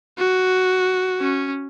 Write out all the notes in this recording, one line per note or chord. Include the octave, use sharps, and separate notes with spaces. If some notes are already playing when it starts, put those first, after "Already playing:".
F#4
C#4